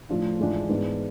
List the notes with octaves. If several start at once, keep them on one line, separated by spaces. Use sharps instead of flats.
A2 F3 A3 D4 F4
G#2 E3 G#3 D4 F4
G#2 E3 B3 D4